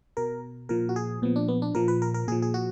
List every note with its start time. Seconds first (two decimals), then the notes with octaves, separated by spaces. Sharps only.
0.17 B2 A#4
0.69 A#2 F3 A#4
0.89 F#4
0.96 G#4
1.22 A#2 F3 B3
1.36 D4
1.48 B3
1.62 D4
1.75 A#2 F3 A#4
1.88 B4
2.02 A#4
2.14 A#4
2.27 A#2 F3 G#4
2.42 G#4
2.54 F#4